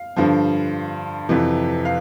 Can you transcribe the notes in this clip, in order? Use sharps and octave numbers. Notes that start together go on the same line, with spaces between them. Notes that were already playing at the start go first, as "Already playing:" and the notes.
Already playing: F5
G2 D3 F3
F2 C3 E3
F5